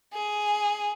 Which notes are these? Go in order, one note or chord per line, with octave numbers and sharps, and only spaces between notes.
G#4